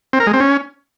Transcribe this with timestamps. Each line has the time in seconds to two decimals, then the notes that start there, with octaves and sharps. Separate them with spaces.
0.13 C4
0.20 A#4
0.27 G#3
0.33 C4
0.40 C#4